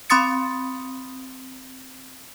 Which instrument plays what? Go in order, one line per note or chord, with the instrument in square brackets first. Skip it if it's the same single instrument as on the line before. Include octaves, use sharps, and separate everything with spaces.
[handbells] C4 B5 C6 D#6 A6 C#7